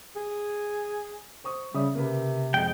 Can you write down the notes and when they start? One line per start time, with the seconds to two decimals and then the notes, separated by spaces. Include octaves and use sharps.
0.16 G#4
1.44 C5 C#6 D#6
1.74 C#3 G3 E5 D#6
1.95 C3 A#3 B4
2.54 F2 G#3 G5